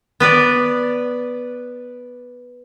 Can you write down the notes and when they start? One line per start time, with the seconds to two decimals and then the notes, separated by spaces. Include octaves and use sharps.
0.20 B3 B4 D5